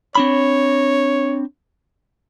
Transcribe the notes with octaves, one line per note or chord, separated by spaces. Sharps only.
C4 D4 C#5 B5